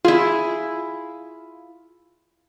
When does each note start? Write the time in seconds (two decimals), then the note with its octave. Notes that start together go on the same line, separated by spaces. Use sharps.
0.05 E4 F4 G#4